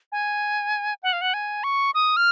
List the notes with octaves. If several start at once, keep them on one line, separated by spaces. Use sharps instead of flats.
G#5
F#5
F5
F#5
G#5
C#6
D#6
F6